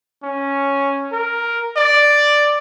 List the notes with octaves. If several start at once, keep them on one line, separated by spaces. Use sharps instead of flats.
C#4
A#4
D5